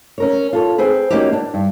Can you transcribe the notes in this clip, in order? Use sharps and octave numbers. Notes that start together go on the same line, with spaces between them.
C#4 A#4 C#5
F4 A4 C#5
C4 G#4 B4
A#3 C#4 D#4 E4 F#4 G4
D4
G2